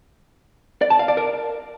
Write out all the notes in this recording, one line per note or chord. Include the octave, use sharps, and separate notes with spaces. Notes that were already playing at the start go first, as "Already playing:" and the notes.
D5
A5
F5
D5
A#4